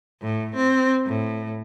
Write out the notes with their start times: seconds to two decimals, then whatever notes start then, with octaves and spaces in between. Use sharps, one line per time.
0.22 A2
0.56 C4
1.06 A2